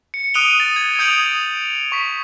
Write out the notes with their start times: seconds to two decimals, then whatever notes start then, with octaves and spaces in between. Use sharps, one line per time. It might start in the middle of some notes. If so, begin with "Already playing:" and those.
0.14 C#7
0.34 D#6 F#6 D7 D#7 F7 G7
0.60 A6
0.76 G#6
0.99 D#6 G6 G#6 D7 F7 F#7
1.92 C#6 B6